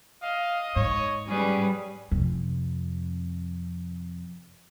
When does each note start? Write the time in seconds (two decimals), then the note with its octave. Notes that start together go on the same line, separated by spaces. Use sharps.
0.22 D#5 F5
0.76 G#2 C#5
1.28 G3 C#4 G#4 B4
2.11 F2 C3